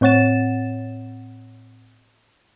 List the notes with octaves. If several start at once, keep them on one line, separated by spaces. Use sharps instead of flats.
A2 C4 C#5 F#5 A6 E7